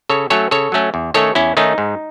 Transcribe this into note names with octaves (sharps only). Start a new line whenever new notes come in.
C#3 A4 C#5
F#3 A3 C#4 A4 C#5
C#3 A4 C#5
F#3 A3 C#4
E2
D#3 A3 C#4 A4 C#5
E2 C#4 E4
D#3 A3 C#4 D#4
G#2